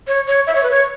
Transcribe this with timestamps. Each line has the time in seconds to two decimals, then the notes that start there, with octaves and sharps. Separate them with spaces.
0.07 C#5
0.27 C#5
0.47 E5
0.55 C#5
0.63 B4
0.71 C#5